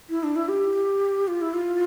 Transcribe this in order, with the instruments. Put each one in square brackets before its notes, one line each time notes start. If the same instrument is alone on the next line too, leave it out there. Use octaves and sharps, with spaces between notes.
[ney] E4
D4
E4
G4
F4
E4
F4